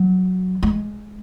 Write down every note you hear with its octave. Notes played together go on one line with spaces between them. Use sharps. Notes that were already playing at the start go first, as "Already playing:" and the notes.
Already playing: F#3
G#3